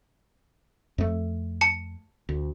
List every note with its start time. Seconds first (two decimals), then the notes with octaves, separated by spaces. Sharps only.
0.98 F2 A3
1.61 A5 C#7
2.29 D2